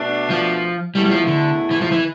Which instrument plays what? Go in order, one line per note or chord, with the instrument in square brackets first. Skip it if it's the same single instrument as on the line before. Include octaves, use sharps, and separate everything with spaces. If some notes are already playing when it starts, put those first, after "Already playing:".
Already playing: [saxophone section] B2 A3 D4
[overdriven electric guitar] F3
[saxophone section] E2 B2 A3 E4 [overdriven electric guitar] G3
[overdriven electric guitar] G3
F3
D3
E3
F3
E3